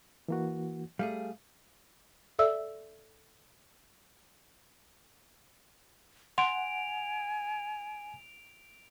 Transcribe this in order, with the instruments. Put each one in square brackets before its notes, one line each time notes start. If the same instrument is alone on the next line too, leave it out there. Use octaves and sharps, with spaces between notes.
[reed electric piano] E3 A#3 F#4
[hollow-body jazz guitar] G3 A3 G#4 [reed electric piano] F5
[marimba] A4 D5 E5 E6
[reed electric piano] F#5 [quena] G#5 [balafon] C6 [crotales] D7 F7